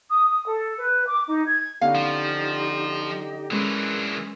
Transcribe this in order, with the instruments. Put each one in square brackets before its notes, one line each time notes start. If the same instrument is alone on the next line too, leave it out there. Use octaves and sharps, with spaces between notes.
[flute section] D#6
D#6
A4
B4
D6
D#4
G#6
[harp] D3 B3 C#4 [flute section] D#4 G4 D#5 [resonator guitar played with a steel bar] F5
[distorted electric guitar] F3
[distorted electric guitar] E3 D4 [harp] G#3 C#4 B4 [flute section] G#4 A#4